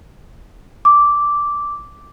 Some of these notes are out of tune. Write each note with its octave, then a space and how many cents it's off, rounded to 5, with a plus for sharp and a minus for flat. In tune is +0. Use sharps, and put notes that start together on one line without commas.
D6 -10